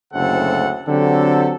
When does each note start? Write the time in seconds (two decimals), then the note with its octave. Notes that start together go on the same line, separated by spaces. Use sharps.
0.13 F#1 D2 C#3 C4 A4 F#5
0.87 D3 F#3 C4 G4 A4